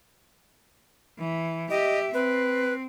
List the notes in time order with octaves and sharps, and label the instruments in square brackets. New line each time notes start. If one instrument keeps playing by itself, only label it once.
[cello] E3
[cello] G4 E5 [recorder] D#5
[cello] C4 [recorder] B4